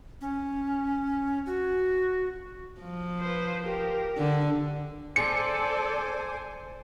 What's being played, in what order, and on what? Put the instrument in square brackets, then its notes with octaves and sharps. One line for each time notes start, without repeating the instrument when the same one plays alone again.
[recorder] C#4
F#4
[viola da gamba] F3
[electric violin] B4 C5
G4 A#4
[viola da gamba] D3
[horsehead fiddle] A4 D5 [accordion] C5 G#5 [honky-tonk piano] C#7